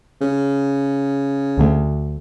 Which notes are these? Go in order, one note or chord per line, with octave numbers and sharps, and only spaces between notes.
C#3
D2 D3 A3